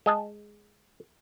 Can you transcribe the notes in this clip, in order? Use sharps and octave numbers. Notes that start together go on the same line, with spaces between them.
G#3 D#5 A5